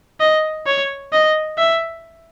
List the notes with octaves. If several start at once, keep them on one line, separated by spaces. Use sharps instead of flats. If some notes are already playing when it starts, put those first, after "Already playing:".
D#5
C#5
D#5
E5